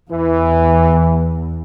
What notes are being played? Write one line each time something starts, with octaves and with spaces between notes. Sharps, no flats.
E2 E3